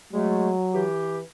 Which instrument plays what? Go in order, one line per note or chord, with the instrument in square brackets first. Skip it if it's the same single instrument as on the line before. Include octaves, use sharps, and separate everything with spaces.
[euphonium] F#3 [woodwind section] G#3 A3
[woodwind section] E3 G4